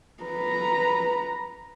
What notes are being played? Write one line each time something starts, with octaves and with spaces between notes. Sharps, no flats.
B4 A#5